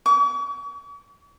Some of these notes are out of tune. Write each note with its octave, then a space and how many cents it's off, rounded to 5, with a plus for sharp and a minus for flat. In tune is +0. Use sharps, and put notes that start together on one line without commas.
C#6 +45